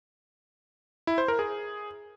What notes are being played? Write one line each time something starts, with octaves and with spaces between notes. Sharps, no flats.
E4
C5
A#4
G#4